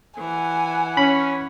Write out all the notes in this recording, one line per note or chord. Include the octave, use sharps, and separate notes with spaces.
E3 F#5 G#5
C#4 B5